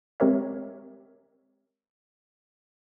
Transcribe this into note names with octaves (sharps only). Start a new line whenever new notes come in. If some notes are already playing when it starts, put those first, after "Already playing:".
G#3 C4 G4 A#4 C#5 E5